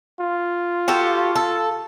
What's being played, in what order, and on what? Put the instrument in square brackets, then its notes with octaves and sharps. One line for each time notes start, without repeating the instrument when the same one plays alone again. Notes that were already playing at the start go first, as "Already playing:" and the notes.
[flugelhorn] F4
[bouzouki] F#4 G4 A4
A4